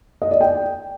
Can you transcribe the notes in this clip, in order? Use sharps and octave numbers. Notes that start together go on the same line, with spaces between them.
D#5
D5
G5